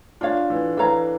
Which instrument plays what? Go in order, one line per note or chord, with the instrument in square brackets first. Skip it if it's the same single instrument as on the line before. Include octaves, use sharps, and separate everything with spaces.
[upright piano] D4 [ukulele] F4 C#5 F5
[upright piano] E3
[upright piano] E3 [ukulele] A4 C#5 F5 A#5